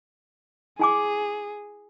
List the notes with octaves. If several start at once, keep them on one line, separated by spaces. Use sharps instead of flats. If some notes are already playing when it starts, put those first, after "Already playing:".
E4 G#4 G#5 D6